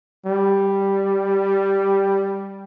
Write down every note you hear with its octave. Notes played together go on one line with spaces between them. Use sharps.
G3